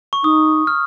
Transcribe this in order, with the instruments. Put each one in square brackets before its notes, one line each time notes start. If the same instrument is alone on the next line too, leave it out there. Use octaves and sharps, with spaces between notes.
[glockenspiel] C#6
[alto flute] D#4 [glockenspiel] D#6
[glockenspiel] F6